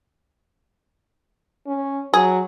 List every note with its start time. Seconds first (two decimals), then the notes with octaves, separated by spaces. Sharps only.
1.67 C#4
2.14 F#3 G#4